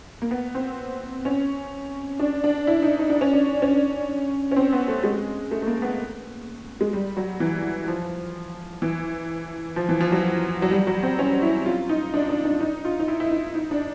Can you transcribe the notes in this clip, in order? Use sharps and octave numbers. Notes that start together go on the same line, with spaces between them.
A#3
B3
C4
C#4
D4
D4
E4
D#4
D#4
D4
C#4
D4
C#4
C#4
C4
B3
A3
G#3
A3
A3
A#3
B3
G#3
G3
F#3
E3
F3
E3
F3
E3
F3
F#3
F#3
G3
F#3
C4
C#4
E4
F4
D#4
D4
D4
D4
D#4
F4
D#4
E4
E4
D#4
D#4
D4